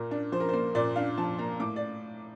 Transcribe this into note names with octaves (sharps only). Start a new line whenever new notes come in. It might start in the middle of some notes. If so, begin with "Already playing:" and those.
Already playing: A#2 A#4
D4
F3 C5
A#4
A#3 C5
A#2 D5
D4 F5
F3 A5
A#3 A#5
A2 D6
D5